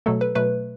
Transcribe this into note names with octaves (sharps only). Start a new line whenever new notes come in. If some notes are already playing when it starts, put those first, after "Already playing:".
B2 F#3 A3 A4
B4
B2 F#3 A3 B4